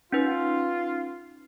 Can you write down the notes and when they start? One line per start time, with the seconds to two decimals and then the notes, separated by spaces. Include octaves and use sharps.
0.12 C#4 D#4 F4 B4